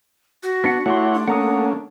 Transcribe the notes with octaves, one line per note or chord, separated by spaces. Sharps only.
F#4
B3 D4 F#5
A3 E4 G4 C#5 F#5 C6
D4
A3 A#3 C#4 F#5 A#5 D#6